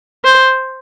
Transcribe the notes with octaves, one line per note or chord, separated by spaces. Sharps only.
C5